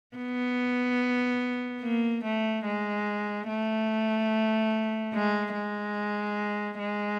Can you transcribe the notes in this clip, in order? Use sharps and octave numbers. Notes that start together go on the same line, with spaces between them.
B3
A#3
A3
G#3
A3
G#3
G#3
G#3